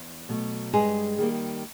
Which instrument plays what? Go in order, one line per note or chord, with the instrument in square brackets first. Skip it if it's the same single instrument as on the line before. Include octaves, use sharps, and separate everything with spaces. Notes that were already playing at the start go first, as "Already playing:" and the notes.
Already playing: [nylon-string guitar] E2
B2 F#3 A3
G2 G#3 G#4
D#3 G3 A#3